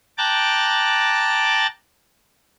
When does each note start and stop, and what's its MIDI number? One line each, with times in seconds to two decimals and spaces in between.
0.18 1.67 79
0.18 1.67 81
0.18 1.67 82
0.18 1.67 86
0.18 1.67 90
0.18 1.67 93